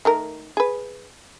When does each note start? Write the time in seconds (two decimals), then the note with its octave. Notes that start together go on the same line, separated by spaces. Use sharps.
0.05 D#3 A3 A#4
0.57 G#4 B4